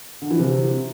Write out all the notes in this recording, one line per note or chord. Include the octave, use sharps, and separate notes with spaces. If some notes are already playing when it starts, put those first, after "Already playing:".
D3
E3
C3